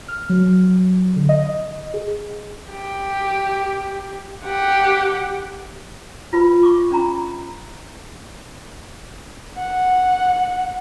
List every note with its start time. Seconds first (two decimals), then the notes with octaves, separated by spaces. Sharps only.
0.08 F6
0.30 F#3
1.16 D3
1.29 D#5
1.94 G#4
2.71 G4
4.45 G4 F#5
6.33 F4 B4 B5
6.63 C#6 D6
6.91 C#4 D4 A#5 B5
9.58 F#5